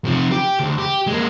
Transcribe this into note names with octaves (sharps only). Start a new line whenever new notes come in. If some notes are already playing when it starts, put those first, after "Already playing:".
C3 F3
G4
D2
G4
G#3 A#3